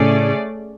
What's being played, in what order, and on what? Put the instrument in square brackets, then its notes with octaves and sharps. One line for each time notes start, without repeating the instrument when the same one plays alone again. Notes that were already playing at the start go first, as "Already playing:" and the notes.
Already playing: [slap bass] A2 C#3 [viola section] A3 C#4 G#4 D5